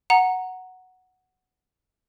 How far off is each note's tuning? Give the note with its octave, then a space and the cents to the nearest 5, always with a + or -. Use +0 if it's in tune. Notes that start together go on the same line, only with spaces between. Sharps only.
F#5 +0 A#5 +0